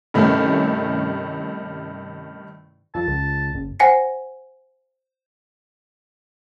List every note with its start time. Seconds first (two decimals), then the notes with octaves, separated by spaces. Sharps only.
0.14 G2 C3 D#3 A3 C#4 E4
2.95 F2 A5
3.08 C#2
3.55 F#1
3.80 C5 F#5 G#5 A#6 C7